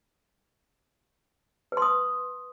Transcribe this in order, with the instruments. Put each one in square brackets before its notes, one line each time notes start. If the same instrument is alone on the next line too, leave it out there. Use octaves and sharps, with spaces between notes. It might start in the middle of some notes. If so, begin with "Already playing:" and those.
[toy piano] B4
C6
D#6